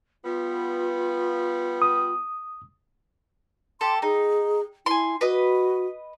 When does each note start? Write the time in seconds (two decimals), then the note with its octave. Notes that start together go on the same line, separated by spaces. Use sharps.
0.24 G3 B3 F4
1.82 D#6
3.81 G4 A4 C6
4.02 D#4 G#4
4.86 E4 G#5 C6
5.21 F#4 B4 D#5